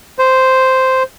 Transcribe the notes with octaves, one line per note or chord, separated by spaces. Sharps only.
C5